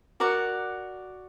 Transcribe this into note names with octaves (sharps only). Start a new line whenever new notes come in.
F#4 A#4 D5 F#5